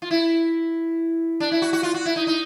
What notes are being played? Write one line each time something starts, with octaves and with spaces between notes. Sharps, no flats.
F4
E4
D4
E4
F#4
F#4
F4
F#4
E4
D#4
D#4